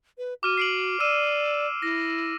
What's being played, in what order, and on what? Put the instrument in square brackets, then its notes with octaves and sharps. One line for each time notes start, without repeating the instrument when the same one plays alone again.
[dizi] B4
[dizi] F#4 [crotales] D6 F6 D#7
[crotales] C7 D7 F#7
[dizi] D5 [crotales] E6 D#7 E7
[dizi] E4 [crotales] A#6